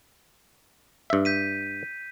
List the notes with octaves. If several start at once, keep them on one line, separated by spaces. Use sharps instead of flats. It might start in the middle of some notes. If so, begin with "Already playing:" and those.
G2 E5
G6 B6 D#7